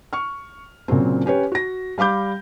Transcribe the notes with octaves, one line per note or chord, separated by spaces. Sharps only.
C#6 F6
A#2 C#3 F#3 C4
C#4 G4 B4 C#5
F#4 A#6
G3 F5 B5 D6 G6